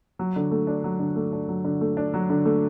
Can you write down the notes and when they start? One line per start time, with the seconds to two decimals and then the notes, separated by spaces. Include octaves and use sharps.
0.19 F#3
0.36 D3
0.51 A3
0.67 D4
0.84 F#3
0.99 D3
1.16 A3
1.32 D4
1.48 F#3
1.64 D3
1.81 A3
1.97 D4
2.14 F#3
2.30 D3
2.45 A3